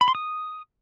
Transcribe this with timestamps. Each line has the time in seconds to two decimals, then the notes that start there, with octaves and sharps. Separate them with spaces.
0.01 B5
0.08 C6
0.15 D#6